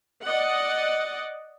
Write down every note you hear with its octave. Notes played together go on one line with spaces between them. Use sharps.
D5 D#5 F#5